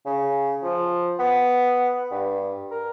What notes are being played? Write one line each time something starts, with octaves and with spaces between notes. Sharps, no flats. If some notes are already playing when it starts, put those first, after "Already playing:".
C#3
F3
B3
G2
A#4